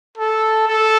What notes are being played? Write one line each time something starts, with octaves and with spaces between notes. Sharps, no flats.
A4
A4